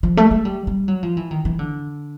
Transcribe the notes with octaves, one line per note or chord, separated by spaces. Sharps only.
F3
A3
G#3
G3
G3
F#3
F3
E3
D#3
E3
D3